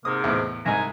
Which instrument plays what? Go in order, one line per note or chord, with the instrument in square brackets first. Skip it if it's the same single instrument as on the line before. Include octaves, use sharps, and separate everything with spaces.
[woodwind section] G#2 C3 A#3 [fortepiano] D#6
[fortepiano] E2 A2
[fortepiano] C2 G#2 [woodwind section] D#4 G#5 A#5